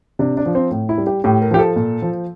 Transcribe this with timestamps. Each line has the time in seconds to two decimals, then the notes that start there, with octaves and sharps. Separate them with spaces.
0.19 C3 D4
0.37 D4
0.46 F3
0.55 C4
0.71 A2
0.89 E4
0.98 G3
1.07 G4
1.24 A2 G4
1.42 A#4
1.51 F3 G4
1.59 A4
1.76 A#2
2.02 F3